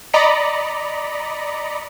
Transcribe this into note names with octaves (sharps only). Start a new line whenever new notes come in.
D5 D#5 A#5 B5 C#7